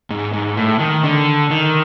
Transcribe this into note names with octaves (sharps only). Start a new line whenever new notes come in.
G#2
G#2
A2
D#3
D3
D#3